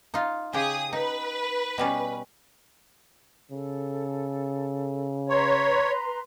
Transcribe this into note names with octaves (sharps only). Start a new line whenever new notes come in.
D#4 F4
C#3 G4 G#4 G5 D#6
D#4 B4
B2 G3 C#4
C#3 A4
B4 C#5 A#5 C6